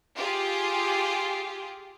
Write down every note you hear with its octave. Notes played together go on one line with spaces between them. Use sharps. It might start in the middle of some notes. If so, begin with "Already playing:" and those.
F4 G4 G#4